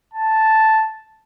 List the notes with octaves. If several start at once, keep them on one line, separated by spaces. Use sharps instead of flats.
A5